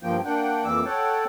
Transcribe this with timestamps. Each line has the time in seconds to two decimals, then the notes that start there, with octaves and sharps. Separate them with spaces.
0.03 G2 F3 A#3 G5
0.25 A#3 D4 F#5 G5
0.64 F2 E3 A#3 D6 E6
0.85 A4 C#5 F#5 G5 A5